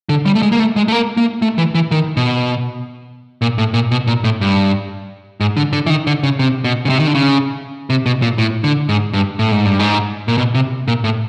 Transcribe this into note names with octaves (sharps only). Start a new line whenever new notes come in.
D3
G3
A3
G#3
A#3
A3
G#3
A3
A#3
A#3
A3
E3
E3
D#3
B2
A#2
A2
A#2
B2
A#2
A2
G2
G#2
D3
D3
E3
D#3
D3
C#3
C3
B2
C#3
C3
D#3
D3
C#3
C3
B2
A#2
A2
D3
G#2
G2
A2
G#2
G2
G#2
A#2
B2
C3
A#2
A2